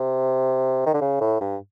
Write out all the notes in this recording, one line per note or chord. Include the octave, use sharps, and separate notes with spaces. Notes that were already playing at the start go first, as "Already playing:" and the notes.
Already playing: C3
D#3
D3
C#3
A2
G2